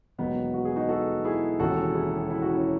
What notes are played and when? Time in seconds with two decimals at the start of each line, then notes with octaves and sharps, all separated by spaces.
0.18 E1 D#2 D#3 F#3 B3 D#4
0.54 F#4
0.65 G#4
0.76 D#4 F#4
0.89 F#4 A4
1.24 E4 G#4
1.60 E1 D#2 C#3 E3 F#4 A4
1.95 E4 G#4
2.30 E4
2.42 F#4
2.54 C#4 E4